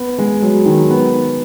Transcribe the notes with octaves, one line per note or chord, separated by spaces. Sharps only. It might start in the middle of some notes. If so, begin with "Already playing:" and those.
Already playing: B3
G#3
F#3
D#3
B3